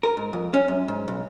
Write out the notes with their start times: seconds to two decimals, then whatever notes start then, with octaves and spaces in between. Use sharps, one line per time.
0.03 A#4
0.17 G#2
0.33 F2
0.54 C#4
0.68 F#2
0.88 G#2
1.08 B1